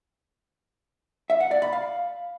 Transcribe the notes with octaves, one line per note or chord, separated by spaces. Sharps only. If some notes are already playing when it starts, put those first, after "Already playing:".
E5
F#5
D5
B5
F5